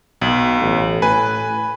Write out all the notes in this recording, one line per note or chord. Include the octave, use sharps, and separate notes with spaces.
B1 B2
A1
A2 B4 G#5